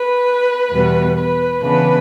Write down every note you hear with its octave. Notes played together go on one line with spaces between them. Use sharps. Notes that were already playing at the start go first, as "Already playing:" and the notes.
Already playing: B4
E2 B2 G3 B3
B4
C#3 E3 B3 D4 B4